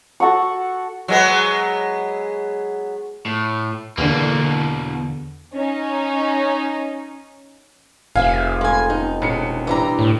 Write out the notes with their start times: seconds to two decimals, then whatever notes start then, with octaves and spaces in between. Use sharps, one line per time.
0.20 F#4 A4 F#5 C#6
1.08 F#3 G#3 B3
3.25 A2
3.98 E2 B2 D3 A#3
5.53 C#4 D#4
8.16 F1 G#4 E5 F5 G#5
8.61 G#3 A4 G#5
8.90 C#4 D#4
9.22 E1 C#7
9.67 E3 G3 D4 E4 G5 A#5
9.99 A2